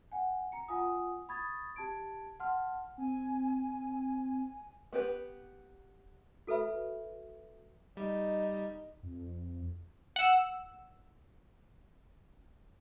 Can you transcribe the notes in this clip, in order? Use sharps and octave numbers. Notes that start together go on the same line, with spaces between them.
F#5 G#5
A#5 C#7
F4 F#5 G#5 D#6
B5 C#6 D#6 G#6 A6
G4 A5 G#6 D7
F#5 A5 C6 F6
C4 G#5
B3 G4 B4
F#4 A4 B4 E5 B5
G3 D#4
F2
F#5 E6